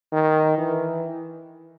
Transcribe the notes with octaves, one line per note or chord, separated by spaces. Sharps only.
D#3
E3